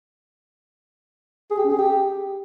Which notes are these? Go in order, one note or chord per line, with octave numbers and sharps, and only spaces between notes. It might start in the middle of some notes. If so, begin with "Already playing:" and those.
G#4
G4
C#4
G#4
G4